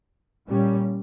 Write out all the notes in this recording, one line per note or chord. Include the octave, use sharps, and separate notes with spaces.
A#2 G3 C#4